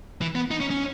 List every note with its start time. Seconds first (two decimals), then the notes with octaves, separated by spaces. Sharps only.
0.21 E3
0.35 B3
0.51 D#4
0.60 C#4
0.71 C#4